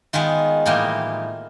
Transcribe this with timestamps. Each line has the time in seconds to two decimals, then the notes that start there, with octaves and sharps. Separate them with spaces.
0.13 D#3 G#3 B3 F4
0.66 A2 E3 G3 A#3 D#4 F4